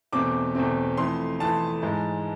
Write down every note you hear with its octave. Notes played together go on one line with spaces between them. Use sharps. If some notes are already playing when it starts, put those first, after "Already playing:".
E2 B2 A3 C4 D6
E2 B2 A3 C4
F2 E3 A3 C6
F2 E3 A3 A5
G#2 E3 G#3